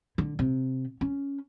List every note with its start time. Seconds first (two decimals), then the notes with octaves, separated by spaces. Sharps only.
0.18 D3
0.39 C3
1.01 C#4